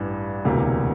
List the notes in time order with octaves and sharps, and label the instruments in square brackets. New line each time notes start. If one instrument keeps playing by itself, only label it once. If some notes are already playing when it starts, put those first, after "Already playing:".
Already playing: [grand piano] A1 G2 E3 G3
E1 D2 C3 E3 A#3